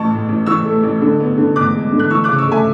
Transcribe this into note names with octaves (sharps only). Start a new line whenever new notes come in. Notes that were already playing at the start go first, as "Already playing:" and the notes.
Already playing: A1 A5 C#6
A2
A1
E3 C#6 E6
A3
A1
D3
B3
D3
E2 D6 F#6
G#3
D3
F#6
E3 C#6 E6
C#3 D6 F#6
C#6 E6
A3 E5 G#5